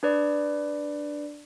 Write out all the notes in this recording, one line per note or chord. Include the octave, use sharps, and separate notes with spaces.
D4 B4 D5